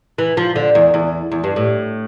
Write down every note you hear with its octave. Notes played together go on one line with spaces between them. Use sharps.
E3
F3
D3
E2
E2
E2
G2
A2